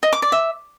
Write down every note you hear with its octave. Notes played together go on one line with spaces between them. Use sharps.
D#5
D6
D5
E5